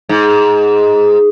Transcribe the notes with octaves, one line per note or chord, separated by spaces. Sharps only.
G#2